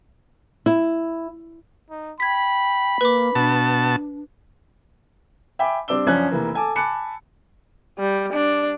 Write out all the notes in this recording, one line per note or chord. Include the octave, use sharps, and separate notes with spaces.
E4
D#4
G5 B5 G#6 B6
A#3 B4 D6
B2 D4 A5
E5 G5 G#5 B5 D6
G3 C4 D4 D6 E6 G7
F#2 F3 C#4 D4 F#6 G#6
F1 E3 A#3
A4 G#5 A5 D6
G#5 A5 B5 D6 F#6 C#7
G3
D4